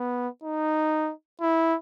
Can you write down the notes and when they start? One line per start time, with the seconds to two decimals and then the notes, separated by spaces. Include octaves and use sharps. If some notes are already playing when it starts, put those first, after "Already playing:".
Already playing: B3
0.43 D#4
1.41 E4